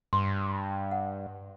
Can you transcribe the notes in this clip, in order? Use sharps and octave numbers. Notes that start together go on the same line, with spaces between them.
G2 C6
F#5